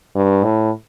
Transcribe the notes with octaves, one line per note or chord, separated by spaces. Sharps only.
G2
A2